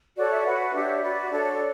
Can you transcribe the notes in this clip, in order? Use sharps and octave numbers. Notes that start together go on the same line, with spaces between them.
F#4 A4 C#5 D5
E5
F#4 B4 F#5
D4 G4 C#5 E5
F#4 B4 D5
D4 A4 C#5 D5